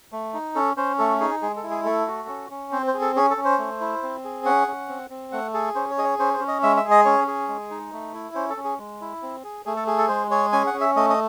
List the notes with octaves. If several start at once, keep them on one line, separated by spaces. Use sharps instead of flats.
A3
D#4
C#4 A4
C#4 C5
A3 A4
D#4 G#4
G#3 G#4
A4
E4
G#4
A3 A4
F#4
C#4
C#4
C4 C5
C5
G#4
A4
C#4 G#4
A4
C#4
C5
A3
E4
C4
G#4
C#4 F#5
C#4
C4
C4
A3 F#5
G#4 A4
C#4 C5
C#5
G#4 D#5
C#5
C#4 C5
C5
C#4
D#5
G#3 E5
E5
G#4
D#5
C#4 C#5
G#4
G#3
D#4
A3
E4
C#4 C5
A4
C#4
G#4
G#3
E4
C4
G#4
A3 G#4
A4
G#4
A4
G#3 C5
G#4 C#5
C#4 G#5
F#5
C#4
E5
A3 D#5
D#5